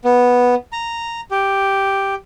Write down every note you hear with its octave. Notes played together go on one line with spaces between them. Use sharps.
B3
A#5
G4